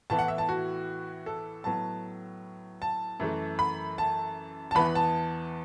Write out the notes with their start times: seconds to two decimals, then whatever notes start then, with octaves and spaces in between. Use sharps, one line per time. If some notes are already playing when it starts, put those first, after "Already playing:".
0.10 A2 E3 B3 A5
0.19 F#5
0.28 E5
0.38 A5
0.49 F#4
1.26 A4
1.64 A2 F#3 B3 A5
2.82 A5
3.20 F#2 E3 A3
3.59 B5
3.98 A5
4.71 A5
4.75 E2 E3 B3 B5
4.95 A5